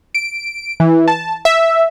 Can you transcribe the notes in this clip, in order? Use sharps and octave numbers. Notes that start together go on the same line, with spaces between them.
D7
E3
A5
E5